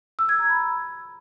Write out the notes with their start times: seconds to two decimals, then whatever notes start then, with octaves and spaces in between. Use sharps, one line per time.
0.19 E6
0.29 G#6
0.39 A#5
0.49 B5